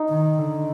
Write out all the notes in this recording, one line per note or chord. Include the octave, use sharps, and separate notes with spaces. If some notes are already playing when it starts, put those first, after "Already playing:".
Already playing: D#4
D#3
D3